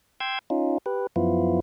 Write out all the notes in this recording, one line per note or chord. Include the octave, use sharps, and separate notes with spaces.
G5 C6 E6 G#6
C#4 D#4 F4
G4 B4
F#2 F3 B3 E4 F4